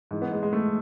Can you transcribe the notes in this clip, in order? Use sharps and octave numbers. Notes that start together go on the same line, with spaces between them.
G#2 E3
B3
G#3
G#3
A3